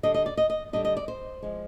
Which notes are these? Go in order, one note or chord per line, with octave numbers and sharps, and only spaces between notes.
D3 G3 D4 D#5
D#5
D5
D#5
D#5
D3 G3 D4 D#5
D#5
D5
C5
F3 G#3